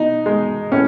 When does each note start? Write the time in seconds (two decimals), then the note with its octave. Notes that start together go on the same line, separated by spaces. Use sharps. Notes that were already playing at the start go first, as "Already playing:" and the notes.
Already playing: B2 D#4
0.26 G#3
0.72 A2 C#4